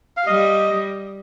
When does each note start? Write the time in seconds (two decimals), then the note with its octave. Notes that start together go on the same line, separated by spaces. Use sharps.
0.17 F5
0.26 G3 D#5